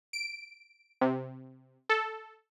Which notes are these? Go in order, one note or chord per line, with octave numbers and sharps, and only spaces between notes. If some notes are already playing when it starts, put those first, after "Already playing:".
D7
C3
A4